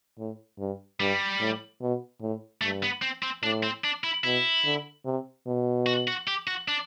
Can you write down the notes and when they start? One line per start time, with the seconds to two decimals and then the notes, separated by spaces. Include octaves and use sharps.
0.18 A2
0.59 G2
1.00 G2 G3
1.40 A2
1.81 B2
2.21 A2
2.61 G2 A3
2.83 B3
3.02 C4
3.23 C4
3.43 A2 D4
3.63 C4
3.84 D4
4.04 E4
4.24 B2 E4
4.65 D3
5.05 C3
5.47 B2
5.86 F#4
6.08 F#4
6.28 G4
6.47 F#4
6.68 D4